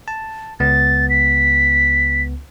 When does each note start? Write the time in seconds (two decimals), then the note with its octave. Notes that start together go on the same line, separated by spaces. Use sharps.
0.08 A5
0.60 C#2 B3 A6
1.10 B6